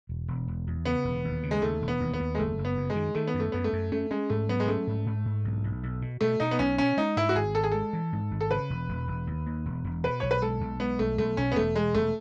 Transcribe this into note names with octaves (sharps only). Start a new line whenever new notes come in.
E1
E1
E1
E2
C#3 B3
E1
D#2
C#3
G#3
D#2 A3
E1
B3
D#2
B3
D#2
G#3
F#1 A3
F#1
B3
F#2
G#3
D#3
D#3 A3
B3
F#2
A3
F#2 B3
A3
F#2
A3 C#4
G#3 C#4
G#2 A3
F#3 B3
G#3
A3 C#4
G#2
G#2
G#2
B1
B1
B1
B2
B2 A3
B2 D#4
B3
B1 C#4
B2 C#4
G#3 D#4
G#2 E4
F#4
G#1 G#4
G#1 A4
G#4
G#3 A4
E3
G#2
G#1
A4
C#3 B4
E1
E1
E1
D#2
D#2
E1
E1
B2 B4
B1 C#5
B4
G#3 A4
B1
G#3 B3
B1 A3
B1 A3
B1 C#4
B3
E1 A3
E1 G#3
E1 A3